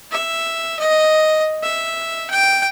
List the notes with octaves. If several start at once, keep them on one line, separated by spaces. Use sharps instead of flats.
E5
D#5
E5
G5